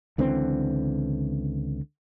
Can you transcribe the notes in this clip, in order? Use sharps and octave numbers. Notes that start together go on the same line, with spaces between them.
C#2 D3 E3 C4